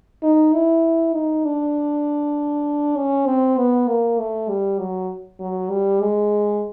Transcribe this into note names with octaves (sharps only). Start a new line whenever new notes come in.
D#4
E4
D#4
D4
C#4
C4
B3
A#3
A3
G3
F#3
F#3
G3
G#3